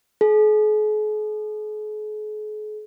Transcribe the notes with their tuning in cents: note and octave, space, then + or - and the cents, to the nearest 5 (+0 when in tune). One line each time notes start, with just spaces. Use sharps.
G#4 +45